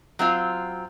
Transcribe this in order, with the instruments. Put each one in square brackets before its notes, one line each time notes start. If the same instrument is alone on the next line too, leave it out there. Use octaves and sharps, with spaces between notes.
[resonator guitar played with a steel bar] F#3 C4 F4